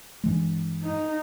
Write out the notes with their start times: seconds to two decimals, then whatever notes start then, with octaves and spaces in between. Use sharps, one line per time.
0.23 G2 E3 G#3
0.84 D#4